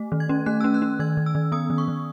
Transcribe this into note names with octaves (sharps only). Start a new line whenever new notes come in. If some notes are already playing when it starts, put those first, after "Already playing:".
Already playing: A3
D#3
G#6
C#4
A3 F#6
C#4 E6
F#6
C#4
D#3 G#6
D#3
E6
D#3
B3 D#6
D#3
C#6
D#3